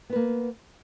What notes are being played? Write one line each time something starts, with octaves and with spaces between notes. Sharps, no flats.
A#3 B3 B4